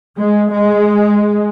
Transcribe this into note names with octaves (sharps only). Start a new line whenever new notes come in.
G#3
G#3